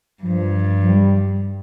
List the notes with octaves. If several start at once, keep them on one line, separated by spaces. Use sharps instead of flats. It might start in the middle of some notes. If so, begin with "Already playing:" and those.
G2 F3
F3
G3